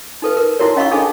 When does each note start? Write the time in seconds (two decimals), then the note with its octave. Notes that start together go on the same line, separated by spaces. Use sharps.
0.22 D#4 A4 B4
0.37 A#4
0.59 D#4 E4 F#4 A#4 C#5
0.76 C#4 D#5 F5 B5 C#6 E6
0.91 D4 D#4 G#4 A4